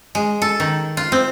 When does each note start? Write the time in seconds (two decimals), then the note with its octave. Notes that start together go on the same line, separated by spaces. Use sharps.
0.15 G#3
0.42 A4
0.60 D#3
0.97 F4
1.12 C4